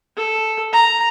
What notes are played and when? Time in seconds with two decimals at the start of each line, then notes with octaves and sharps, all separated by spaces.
0.17 A4
0.73 A#5